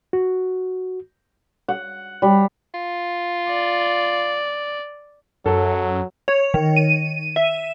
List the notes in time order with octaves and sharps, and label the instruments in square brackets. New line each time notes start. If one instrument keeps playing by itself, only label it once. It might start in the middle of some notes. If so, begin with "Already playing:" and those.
[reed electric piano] F#4
[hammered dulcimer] F#5
G3
[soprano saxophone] F4
[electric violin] D5
[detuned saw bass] F#2 [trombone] F#3 [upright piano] A4
[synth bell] C#5
D#3
D#7
E5